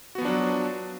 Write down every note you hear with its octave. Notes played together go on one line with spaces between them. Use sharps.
F3 F#3 B3 D4 F#4